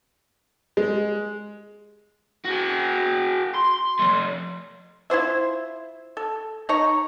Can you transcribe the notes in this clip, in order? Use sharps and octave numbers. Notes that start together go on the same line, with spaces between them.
G#3
F#4 G#4
C6
F3 A3
E4 F4 C5 E5
A4
D#4 C#5 A#5